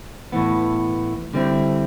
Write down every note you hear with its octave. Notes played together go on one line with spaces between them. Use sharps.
A2 E3 B3
D3 G3 C4 E4